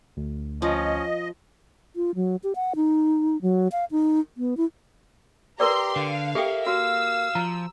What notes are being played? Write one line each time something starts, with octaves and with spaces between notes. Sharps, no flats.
D2
F3 C#4 D#5
F4
F#3
G4
F#5
D#4
F#3
F5
D#4
B3
E4
G4 A#4 B4 D5 A#5 C6
D3 F5
A#3 G4 A4 E5 G5
F#4 F5 E6
F3 A#5